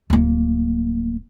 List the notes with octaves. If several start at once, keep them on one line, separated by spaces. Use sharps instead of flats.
D1 A#3